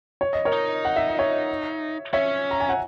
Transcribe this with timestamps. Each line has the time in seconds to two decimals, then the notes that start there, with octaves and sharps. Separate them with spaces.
0.21 C#5
0.33 D#5
0.45 A#4 C#5
0.52 D#4
0.85 F#5
0.96 E5
1.08 D#5
1.19 C#5 E5
2.13 C#4 C#5 E5
2.51 A#5
2.60 G#5
2.69 F#5